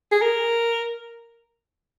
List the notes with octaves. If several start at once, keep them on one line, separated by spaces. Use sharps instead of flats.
G#4
A#4